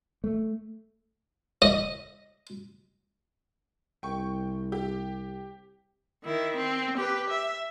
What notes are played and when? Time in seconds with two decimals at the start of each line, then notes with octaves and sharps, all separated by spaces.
0.24 A3
1.62 D#5
4.03 C2 G5 C#6
4.72 G4
6.24 D#3 E4
6.56 C4
6.97 G4 B4
7.30 E5